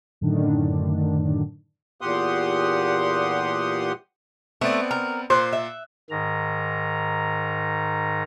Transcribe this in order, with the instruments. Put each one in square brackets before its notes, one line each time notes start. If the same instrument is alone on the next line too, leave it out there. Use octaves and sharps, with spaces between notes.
[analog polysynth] F#2 A2 D3 D#3 D4
[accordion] E2 A#2 G4 F#5 C6 D#6
[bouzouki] A3 [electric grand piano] B3 C4 D5
[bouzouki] A#4
[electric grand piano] A#2 F#6 [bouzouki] C5
[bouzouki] E5
[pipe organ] G#2 D#3 A#5